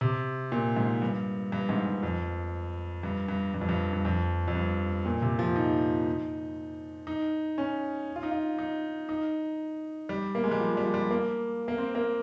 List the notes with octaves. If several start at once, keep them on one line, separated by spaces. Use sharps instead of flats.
C3
A#2
G#2
G2
G2
G#2
G2
F2
G2
G2
G2
F2
G2
G2
F2
F2
G2
A#2
C3
F3
D#4
D#4
C#4
F4
D#4
F4
D#4
D#4
G3
A#3
G#3
G3
F3
G3
F3
G3
A#3
A#3
C4
A#3